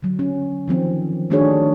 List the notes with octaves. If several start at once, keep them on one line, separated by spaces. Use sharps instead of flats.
D3 F#3
C#4
D#3 F3 C4
D#3 A3 D4 F#4 G#4 C#5